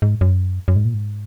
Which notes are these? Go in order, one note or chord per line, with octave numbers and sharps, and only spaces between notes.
G#2
F#2
F#2
G#2
A#2
G#2